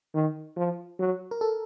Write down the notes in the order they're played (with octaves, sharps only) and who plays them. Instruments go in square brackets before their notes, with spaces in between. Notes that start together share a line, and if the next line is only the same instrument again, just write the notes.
[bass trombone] D#3
F3
F#3
[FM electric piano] A#4
A4